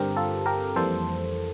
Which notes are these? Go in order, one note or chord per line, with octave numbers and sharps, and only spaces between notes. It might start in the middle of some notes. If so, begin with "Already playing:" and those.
Already playing: G2 D3 G3 C4 G4 A#4
F4 A4
G4 A#4
F2 E3 G3 A#3 A4 C5